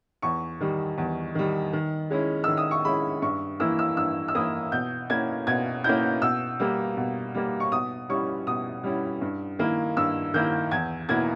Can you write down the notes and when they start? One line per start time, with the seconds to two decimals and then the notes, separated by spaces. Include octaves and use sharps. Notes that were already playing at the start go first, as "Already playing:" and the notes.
0.22 E2 C#6
0.60 D#3 G3
0.98 E2
1.35 D#3 G3
1.73 D#3
2.10 G#3 C#4 E4
2.44 D#3 E6
2.57 D#6
2.71 C#6
2.85 G#3 C#4 E4 B5
3.22 G2 C#6
3.60 E3 A#3 E4 E6
3.79 E6
3.97 G2 E6
4.28 E6
4.35 E3 A#3 E4 D#6
4.72 B2 G6
5.10 A#3 C#4 E4 G#6
5.47 B2 G#6
5.84 A#3 C#4 E4 G6
6.22 B2 E6
6.60 G3 A#3
6.97 B2
7.35 G3 A#3
7.60 C#6
7.72 B2 D#6
8.09 G3 C#4 E4 C#6
8.47 B2 D#6
8.84 G3 C#4 E4
9.21 G2
9.59 D#3 A#3 E4
9.97 G2 E6
10.34 D#3 A#3 E4 G6
10.71 E2 G#6
11.09 B2 A#3 E4 G#6